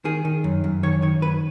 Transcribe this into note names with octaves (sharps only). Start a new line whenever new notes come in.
D#3 G#4
D#3
F#2
F#2
D#3 C#5
D#3 C#5
F#2 B4